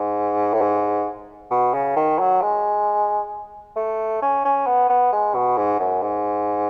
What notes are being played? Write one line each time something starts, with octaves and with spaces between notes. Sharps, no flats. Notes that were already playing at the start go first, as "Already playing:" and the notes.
Already playing: G#2
A2
G#2
B2
C#3
D#3
F#3
G#3
A3
C#4
C#4
B3
B3
G#3
B2
G#2
F#2
G#2